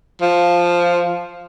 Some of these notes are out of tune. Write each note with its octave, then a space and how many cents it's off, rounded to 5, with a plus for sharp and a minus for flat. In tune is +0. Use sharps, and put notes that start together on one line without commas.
F3 +0